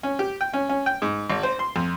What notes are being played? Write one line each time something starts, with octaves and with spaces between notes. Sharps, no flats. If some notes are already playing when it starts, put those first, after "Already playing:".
C#4
G4
G5
C#4
C#4
G5
G#2
G#1
C5
C6
F2